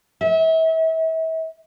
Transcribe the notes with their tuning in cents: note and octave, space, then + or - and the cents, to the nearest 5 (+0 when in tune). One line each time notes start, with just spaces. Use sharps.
E5 -35